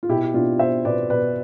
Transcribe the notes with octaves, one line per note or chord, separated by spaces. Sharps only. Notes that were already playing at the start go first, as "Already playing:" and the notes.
F4
B2 E4 G4
B2 D4 F4
B2 C5 E5
B2 B4 D5
B2 B4 D5